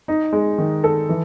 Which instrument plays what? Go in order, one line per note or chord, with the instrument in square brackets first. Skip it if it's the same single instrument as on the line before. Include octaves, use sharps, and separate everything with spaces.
[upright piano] D#4
G#3
D#3
A4
E3